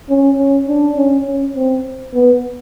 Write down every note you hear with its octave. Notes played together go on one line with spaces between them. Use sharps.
C#4
C#4
D4
C#4
C#4
C4
B3